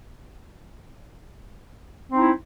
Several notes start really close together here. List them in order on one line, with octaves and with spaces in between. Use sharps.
C4 D#4 E4